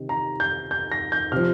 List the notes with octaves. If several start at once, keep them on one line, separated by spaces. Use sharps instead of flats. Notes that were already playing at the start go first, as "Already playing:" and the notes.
Already playing: C3 D#3
A#5
G6
G6
A#6
G6
C3 F3 F6